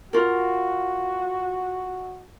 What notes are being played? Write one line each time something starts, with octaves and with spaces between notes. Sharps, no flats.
F4 F#4 A#4